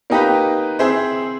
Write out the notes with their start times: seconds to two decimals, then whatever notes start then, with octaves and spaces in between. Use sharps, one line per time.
0.10 A#3 D#4 G4 B4
0.79 C4 E4 G#4 C5 E5